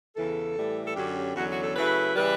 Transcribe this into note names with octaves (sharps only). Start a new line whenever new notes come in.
E2 C#3 E3 A4
A2 E3 G3
A4
F#2 D3 F#3 C#4 G4
E2 D3 F#3 C#4 F#4
F#4
A4
C#3 F#3 A3 E4 B4
C#3 E3 G3 B4